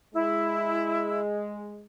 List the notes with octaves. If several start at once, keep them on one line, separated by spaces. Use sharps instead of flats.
G#3 E4